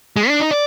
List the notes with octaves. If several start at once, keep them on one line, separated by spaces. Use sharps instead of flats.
G#3
D4
D#4
D5